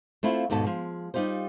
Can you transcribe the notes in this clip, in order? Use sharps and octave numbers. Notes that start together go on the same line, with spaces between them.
A3 C4 E4 F4
D#2 G#2 B2 A4 A5
F3 G#3
G3 D#4 F4 G4 C5